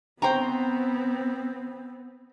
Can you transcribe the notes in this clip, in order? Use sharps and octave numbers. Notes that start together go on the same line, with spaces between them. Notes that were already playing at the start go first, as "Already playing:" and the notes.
B3 C4 C5 G5 A#5